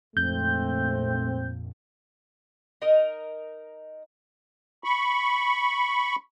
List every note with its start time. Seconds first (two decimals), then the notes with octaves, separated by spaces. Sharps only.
0.17 A#1 F2 G#2 A3 C4 G6
2.82 D#4 A#4 D#5
4.84 B5 C#6